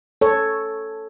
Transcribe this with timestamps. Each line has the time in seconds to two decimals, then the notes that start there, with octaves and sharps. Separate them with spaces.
0.21 A4 C#5